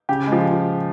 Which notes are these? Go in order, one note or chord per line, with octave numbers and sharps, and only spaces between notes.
C#3 G4
F3 G#3